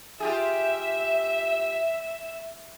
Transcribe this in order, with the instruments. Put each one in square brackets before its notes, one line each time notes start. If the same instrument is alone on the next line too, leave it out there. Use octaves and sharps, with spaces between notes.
[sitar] F4 G4 G#4 [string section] E5